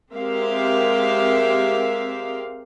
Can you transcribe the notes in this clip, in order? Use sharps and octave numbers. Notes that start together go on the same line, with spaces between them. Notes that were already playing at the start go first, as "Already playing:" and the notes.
G#3 C4 G4 A#4 E5 F5